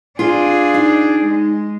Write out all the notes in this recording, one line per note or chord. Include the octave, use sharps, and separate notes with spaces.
D4 F4 G#4
D#4
G#3